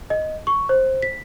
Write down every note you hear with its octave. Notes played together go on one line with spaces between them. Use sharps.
D#5
C#6
C5
B6